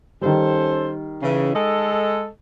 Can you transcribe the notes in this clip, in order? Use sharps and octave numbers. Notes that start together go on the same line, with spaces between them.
D#3 G3 C#4 A4 C5
C#3 E3
G#3 A4 D#5